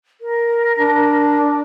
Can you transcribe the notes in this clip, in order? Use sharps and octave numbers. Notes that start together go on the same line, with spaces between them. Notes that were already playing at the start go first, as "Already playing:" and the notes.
A#4
D4